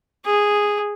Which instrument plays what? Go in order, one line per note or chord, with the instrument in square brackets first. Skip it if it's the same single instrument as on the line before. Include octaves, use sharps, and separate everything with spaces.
[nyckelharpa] G#4